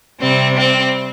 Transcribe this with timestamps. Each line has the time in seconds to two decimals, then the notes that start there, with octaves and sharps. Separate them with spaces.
0.20 C3 G3 C4
0.58 C4